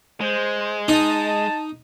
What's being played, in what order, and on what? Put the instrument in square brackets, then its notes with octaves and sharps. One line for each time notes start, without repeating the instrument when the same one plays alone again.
[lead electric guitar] G#3 [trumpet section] C5
[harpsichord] D#4 [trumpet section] A5